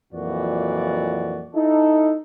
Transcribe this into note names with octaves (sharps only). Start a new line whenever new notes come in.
F2 A#2 E3 F#3 F#4 D5
D#4 E4 A4